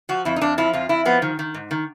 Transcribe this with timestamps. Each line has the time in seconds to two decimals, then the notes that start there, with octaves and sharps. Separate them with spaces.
0.09 F3 F#4
0.25 F2 E4
0.36 D#4
0.41 F2 D4
0.58 F3 E4
0.73 F2 F4
0.89 F2 E4
1.05 F3 B3
1.22 D#3
1.39 D#3
1.54 G#2
1.71 D#3